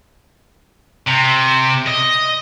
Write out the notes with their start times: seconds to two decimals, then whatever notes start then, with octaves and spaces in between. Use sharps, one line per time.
1.07 C3
1.87 D#5